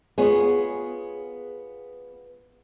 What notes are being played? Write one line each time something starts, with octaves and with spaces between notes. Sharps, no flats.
B3 F4 G#4 C#5